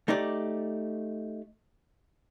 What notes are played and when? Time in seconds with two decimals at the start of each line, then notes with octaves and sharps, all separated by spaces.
0.08 A3 D#4 G4 D5